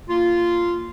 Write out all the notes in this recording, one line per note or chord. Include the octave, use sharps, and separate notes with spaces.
A#3 F4